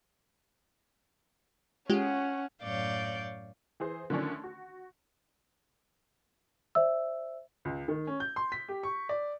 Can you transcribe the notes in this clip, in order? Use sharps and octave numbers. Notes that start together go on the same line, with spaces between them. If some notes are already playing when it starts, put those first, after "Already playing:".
G#3 C#4 F4 G4 F#5
F#2 A2 C#5 D5 F5 G6
E3 G#4 C5
D3 D#3 F3 A3 C#4 D4
F#4
C5 D5 E5 E6
C#2
D#3
C#4
G6
C6
B6
G4
C#6
D5